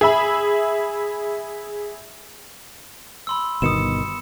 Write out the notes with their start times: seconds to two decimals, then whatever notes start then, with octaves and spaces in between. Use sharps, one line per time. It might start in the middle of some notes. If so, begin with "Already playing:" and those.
0.01 G#4 E5 B5
3.27 B5 C6 E6
3.62 G1 B2 D#3 D#6 C#7 E7